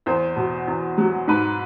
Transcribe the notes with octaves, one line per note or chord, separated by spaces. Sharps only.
E2 C5
B2
E2
F#3
G#2 B4